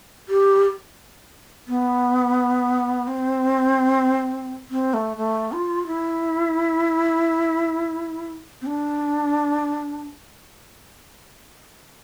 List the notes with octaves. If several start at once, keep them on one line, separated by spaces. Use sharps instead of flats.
G4
B3
C4
C4
A3
A3
F4
E4
C4
D4